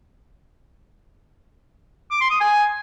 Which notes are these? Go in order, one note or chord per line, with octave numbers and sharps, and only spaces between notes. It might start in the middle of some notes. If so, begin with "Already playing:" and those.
D6
C6
D#6
G#5